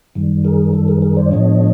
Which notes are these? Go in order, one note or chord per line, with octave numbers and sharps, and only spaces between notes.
F#2 D#3 G3
G#4 A#4
A4
G#4 A#4
G#4 A#4
C5 D5
A2 F3 G#3 B3 D4 C#5 D#5